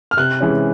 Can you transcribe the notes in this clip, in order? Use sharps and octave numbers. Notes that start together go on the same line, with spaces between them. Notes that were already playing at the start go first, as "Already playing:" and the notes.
F6
C3 F#6
E3 G#3 C#4